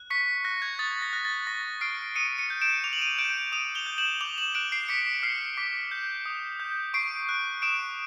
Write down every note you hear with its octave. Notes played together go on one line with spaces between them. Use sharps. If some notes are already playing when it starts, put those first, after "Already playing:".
Already playing: F#6
C#6 B6 C#7
F#6 A#6
G#6
D#6 A6
A#6
F#6
A6
C#6 A#6
F6 C7 D7
D#6 C#7 D#7
C#7 D#7
G6
D7 E7
D6 F7
F#7
D#7 F7
G6 D7 E7
D#6 D#7 F7
F7 G7
G6
E7 F#7
D6 F7 G7
E7 F#7
F#6 D7 E7
C7 D7
D6 B6 C#7
F6 C7
D6 B6
G6
D#6
G6
C#6 C7 D7
F#6
D#6 D7 E7